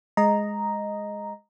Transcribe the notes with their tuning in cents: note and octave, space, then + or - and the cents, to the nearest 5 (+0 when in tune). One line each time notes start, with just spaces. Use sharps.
G#3 +0 D#5 +0 A#5 +0